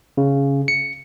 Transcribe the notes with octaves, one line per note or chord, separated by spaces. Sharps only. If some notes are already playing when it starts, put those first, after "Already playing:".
C#3
C#7